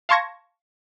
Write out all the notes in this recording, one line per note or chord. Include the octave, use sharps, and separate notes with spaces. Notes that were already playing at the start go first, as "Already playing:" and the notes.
F5 A5 C6 C#6 G#6 A#6